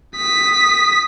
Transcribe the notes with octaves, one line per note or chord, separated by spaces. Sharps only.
D#6 B6